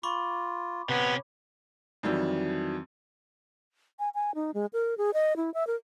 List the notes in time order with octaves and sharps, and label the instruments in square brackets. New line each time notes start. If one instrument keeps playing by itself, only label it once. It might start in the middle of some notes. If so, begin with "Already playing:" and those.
[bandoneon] F4 [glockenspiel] B5 C#6 D6
[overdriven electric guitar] C3 C#4 [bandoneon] B3 B4
[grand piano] F2 D#3 E3 F#3 G3
[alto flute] G#5
G#5
D#4
G#3
A#4
G#4
D#5
E4
E5
A#4